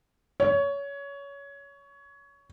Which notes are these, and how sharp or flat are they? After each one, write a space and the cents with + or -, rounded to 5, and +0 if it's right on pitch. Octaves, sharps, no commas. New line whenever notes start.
C#5 +20